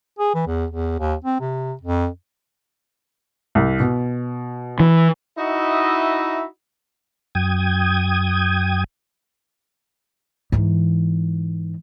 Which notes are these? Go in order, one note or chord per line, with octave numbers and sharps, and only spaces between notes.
G#4
E3
E2
E2
D#2
C4
C3
F2
C2
B2
E3
D#4 E4 F#4 D#5 E5
F#2 G5 D#6 G#6
G#2 E3